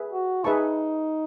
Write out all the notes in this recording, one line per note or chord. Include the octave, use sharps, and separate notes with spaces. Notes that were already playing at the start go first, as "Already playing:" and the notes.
Already playing: G#4 B4 E5
F#4
D#4 G#4 B4 E5 A5 C#6